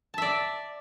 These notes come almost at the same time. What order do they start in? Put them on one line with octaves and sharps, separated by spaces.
A5 E5 D5